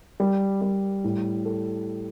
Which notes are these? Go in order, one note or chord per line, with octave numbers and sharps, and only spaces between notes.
G3
G3
A2
A4